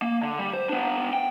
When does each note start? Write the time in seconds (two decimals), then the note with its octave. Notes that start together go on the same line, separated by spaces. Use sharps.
0.02 A#3
0.23 D3
0.39 G3
0.54 C5
0.69 B3 D4
1.13 G5